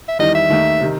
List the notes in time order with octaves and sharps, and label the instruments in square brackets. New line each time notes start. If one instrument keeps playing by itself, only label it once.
[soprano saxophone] E5
[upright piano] E2 D#3 G3 D#4 [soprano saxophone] D#5
[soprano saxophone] E5
[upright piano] D#2 D#3 A3
C3 D#3